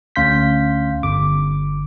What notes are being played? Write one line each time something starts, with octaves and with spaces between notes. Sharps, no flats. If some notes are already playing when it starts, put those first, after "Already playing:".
D2 C#4 F5 C6 G6 B6
G1 D6